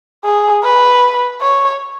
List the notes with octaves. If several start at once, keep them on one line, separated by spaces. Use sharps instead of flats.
G#4
B4
C#5